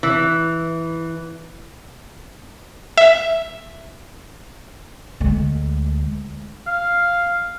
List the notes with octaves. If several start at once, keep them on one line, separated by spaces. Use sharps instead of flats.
E3
E5
D2 G#3
F5